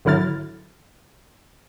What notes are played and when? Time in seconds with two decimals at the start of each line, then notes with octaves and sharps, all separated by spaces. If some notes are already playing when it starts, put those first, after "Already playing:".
0.05 G#1 D3 F#3 E4 F6 A6